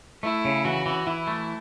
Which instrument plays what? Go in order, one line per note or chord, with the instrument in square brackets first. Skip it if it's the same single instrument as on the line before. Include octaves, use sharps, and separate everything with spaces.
[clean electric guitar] A3 [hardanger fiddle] E4
[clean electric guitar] C#3
[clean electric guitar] E3 [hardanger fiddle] F#4
[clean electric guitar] E3
[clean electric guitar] E3 [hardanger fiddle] E4
[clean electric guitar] A3